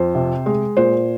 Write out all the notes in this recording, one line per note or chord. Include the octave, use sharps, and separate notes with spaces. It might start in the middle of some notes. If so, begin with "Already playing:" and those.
Already playing: F2 C5
C3
G#3
A#2 C5